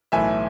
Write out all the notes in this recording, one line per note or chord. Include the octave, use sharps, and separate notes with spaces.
B1 A2 E3 A3 E5 G#5